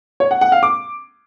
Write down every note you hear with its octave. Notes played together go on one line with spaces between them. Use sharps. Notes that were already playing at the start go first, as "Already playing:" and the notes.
C#5
F#5
F#5
F5
D6